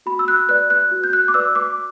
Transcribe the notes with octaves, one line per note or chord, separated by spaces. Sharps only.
F#4 B5
E6
F#6
B4 D5 F#6
F#6
F#4
G6
F#6
D6
B4 D5 E6
D6